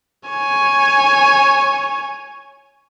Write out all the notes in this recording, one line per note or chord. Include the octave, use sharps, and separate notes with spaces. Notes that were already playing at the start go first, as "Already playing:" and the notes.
C#5 G#5